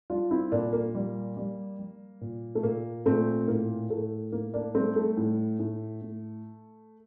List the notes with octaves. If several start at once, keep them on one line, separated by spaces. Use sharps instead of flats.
G3 D4 F4
C4 E4
A#2 A#3 D4
A#3
G3
G3
G3
A#2
A3
A#2 A#3
A#2 A3 C4
A2 A#3
A2 A3
A2 A#3
A#3 D4
G3 A3 C4
A3
A2
A2
A2